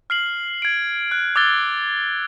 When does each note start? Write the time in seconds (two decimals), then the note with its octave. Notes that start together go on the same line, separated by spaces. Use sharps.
0.10 F6 C7 F#7
0.62 G#6 D7
1.11 F#6
1.36 D6 E6 F#6 G#6 A6 G7